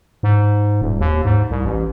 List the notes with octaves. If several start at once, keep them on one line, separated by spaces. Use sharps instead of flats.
G#2
D#1
D#2
G#2
C2
A1